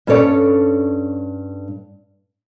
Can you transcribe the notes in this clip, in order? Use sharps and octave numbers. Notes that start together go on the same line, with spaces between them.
G2 C#4 A4 C#5 D5